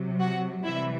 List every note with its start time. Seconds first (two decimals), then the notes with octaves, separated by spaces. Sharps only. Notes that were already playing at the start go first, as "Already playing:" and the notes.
Already playing: C3 F#3
0.20 F#4 F#5
0.64 C3 E3 G3 E4 E5